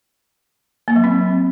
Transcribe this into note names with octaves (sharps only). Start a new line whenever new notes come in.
A#3
F#3
C4